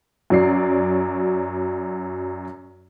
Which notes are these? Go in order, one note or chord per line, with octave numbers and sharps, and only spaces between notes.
F#2 F#3 D5 C7